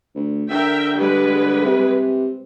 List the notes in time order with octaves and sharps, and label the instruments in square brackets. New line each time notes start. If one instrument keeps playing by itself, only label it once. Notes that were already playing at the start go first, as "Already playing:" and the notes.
[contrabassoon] D2
[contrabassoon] D3 [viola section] A#4 E5 G5
[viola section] G3 G#3 B4
[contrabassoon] C3